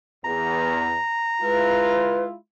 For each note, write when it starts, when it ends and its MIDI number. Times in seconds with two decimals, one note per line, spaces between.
0.25 0.97 40
0.25 2.18 82
1.42 2.37 56
1.42 2.37 64
1.42 2.37 65
1.42 2.23 71